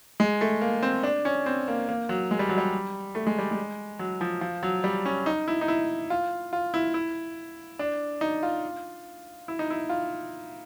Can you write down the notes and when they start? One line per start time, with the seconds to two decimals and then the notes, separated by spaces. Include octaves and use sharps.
0.20 G#3
0.41 A3
0.61 A#3
0.83 C4
1.03 D4
1.25 C#4
1.46 C4
1.68 A#3
1.89 A#3
2.09 F#3
2.31 G#3
2.39 G3
2.49 F#3
2.58 G3
3.15 A3
3.27 G#3
3.39 G3
3.51 G#3
3.99 F#3
4.21 F3
4.41 F3
4.63 F#3
4.84 G3
5.05 C#4
5.26 D#4
5.48 E4
5.61 D#4
5.68 E4
6.10 F4
6.53 F4
6.74 E4
6.94 E4
7.79 D4
8.21 D#4
8.43 F4
9.48 E4
9.59 D#4
9.71 E4
9.89 F4